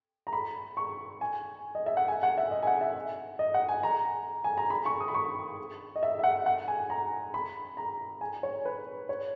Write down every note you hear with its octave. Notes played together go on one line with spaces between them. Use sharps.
A#5
B5
C#6
G#5
D#5
E5
F#5
G#5
F#5
E5
D#5
G#5
F#5
E5
D#5
F#5
G#5
A#5
G#5
A#5
B5
C#6
D#6
B5
C#6
D#5
E5
E5
F#5
F#5
G#5
A#5
B5
A#5
G#5
C#5
B4
C#5